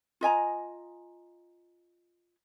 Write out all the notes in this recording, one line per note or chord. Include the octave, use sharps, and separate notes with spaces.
F4 D#5 G#5 A#5